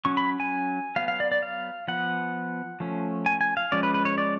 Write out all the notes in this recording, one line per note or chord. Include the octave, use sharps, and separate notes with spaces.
F#3 C#4 C#6
B5
G#5
F#3 B3 F5
F5
D5
D5
F5
F3 B3 F#5
F3 A3 C#4
G#5
G#5
F5
F3 G#3 C#4 D5
B4
B4
C#5
D5